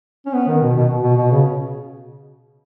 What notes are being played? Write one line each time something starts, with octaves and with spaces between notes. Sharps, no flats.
C#4
B3
D#3
B2
B2
B2
B2
C#3